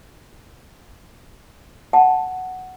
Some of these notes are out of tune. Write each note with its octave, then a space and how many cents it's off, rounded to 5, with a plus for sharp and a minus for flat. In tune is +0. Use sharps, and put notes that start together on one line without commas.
F#5 +0 A5 +0